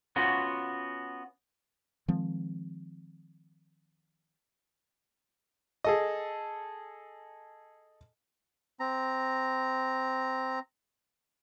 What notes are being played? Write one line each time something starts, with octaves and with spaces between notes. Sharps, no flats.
B3 C#4 F4 F#4
D#3 F3 G#3 C4
G#4 A4 D#5
C4 A#5